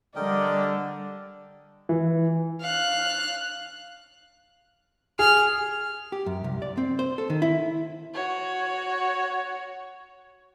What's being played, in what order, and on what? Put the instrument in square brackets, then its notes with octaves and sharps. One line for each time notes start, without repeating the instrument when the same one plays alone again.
[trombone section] D3 [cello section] G3 [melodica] A#4 D#5 G5 [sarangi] D5
[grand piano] E3
[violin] F5 F#6
[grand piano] G#4 [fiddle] F6
[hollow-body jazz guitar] G4
F#2
C2
D5
C4
C5
A4
D#3
E4
[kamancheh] F#4 C#5